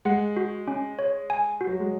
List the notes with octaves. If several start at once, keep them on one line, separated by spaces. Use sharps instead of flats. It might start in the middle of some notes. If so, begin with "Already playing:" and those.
G#3 F#5
F#4
C#4
C#5
G#5
F#4
F#3
G#3